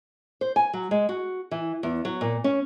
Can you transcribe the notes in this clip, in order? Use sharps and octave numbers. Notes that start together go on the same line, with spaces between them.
C5
G#5
F#3
G#3
F#4
E3
E2
F#3
A#2
C#4